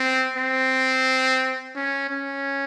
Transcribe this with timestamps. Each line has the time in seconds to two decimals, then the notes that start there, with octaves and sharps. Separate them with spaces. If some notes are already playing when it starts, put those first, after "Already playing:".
Already playing: C4
0.36 C4
1.75 C#4
2.10 C#4